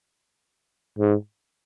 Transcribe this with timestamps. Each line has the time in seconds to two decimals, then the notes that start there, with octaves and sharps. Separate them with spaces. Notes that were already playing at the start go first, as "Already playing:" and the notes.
0.98 G#2